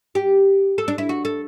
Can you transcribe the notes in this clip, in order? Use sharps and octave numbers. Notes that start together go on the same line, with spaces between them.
G4
A4
D4
E4
F#4
A4